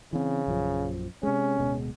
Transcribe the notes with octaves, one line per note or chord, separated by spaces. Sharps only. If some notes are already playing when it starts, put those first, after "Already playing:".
C#3 E3 C4
A#1 F#2 F3
C3 G#3 C#4
D1 B2 G#3